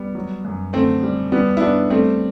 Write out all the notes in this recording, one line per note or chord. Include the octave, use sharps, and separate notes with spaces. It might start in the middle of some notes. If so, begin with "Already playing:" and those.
Already playing: G3 B3
F#3
F#2
D3 A3 C4
G3
E3 G3 B3
E4
G3 B3 D4
G3 A3 C4